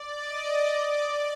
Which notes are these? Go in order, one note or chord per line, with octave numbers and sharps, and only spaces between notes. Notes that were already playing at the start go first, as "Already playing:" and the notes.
Already playing: D5
D#5
D5